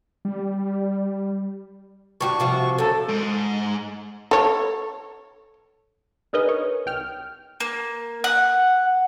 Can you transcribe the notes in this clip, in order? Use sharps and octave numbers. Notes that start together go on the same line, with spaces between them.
G3
G2 G3 F#4 C#6
C3 F3 F#4
F#2 D3 A4
G#2
A4 C#5
D4 D#4 G#4 A#4 B4 D#5
C#5
C2 G5 F6
A#3
F#5